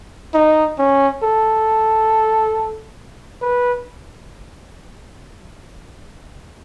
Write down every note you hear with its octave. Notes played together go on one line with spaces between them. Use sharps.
D#4
C#4
A4
B4